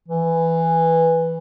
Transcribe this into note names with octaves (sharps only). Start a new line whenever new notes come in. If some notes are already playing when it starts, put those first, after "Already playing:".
E3